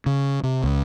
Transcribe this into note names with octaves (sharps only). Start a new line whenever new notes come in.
C#3
C3
C#2